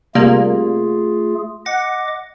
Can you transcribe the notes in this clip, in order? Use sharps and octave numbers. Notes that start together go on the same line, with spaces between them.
C3 G3 A3 A#3 F4 G#4
D#5 F#5 D6